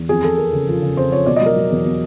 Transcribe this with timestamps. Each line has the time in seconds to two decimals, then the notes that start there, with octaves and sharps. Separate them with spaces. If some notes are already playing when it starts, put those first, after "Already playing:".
Already playing: E2
0.09 F2 G#4
0.24 F2 A4
0.38 F2 A#4
0.53 C#3
0.68 F3
0.82 C#3
0.97 F2 C5
1.12 F3 C#5
1.26 B2 D5
1.36 F#3 D#5
1.46 A#4
1.56 F#3
1.71 E2
1.86 B2